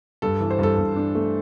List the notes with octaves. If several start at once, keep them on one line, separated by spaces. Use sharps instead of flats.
G2 A4
E3
C5
G2 A4
G2
D4
A3